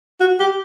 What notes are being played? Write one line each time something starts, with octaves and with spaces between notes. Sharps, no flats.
F#4
G4